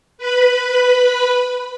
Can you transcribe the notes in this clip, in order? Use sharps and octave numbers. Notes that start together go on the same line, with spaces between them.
B4 B5